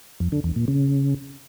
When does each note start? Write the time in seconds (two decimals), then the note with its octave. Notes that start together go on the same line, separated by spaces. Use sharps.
0.20 F2
0.32 D3
0.44 E2
0.56 A#2
0.68 C#3